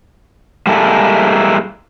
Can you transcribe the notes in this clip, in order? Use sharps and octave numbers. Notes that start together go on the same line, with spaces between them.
G3 G#3 A#3 E4 A4